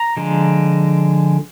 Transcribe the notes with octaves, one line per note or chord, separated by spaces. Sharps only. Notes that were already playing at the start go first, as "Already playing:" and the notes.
Already playing: A#5
D3 F3 G#3